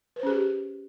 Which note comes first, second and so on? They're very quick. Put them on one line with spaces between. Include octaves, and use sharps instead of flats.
B4 C5 C#4 G#4 G4